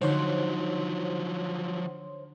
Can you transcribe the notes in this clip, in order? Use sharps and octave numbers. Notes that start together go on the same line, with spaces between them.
D3 F3 F#3 D#4 C5 C#5 F#5 C6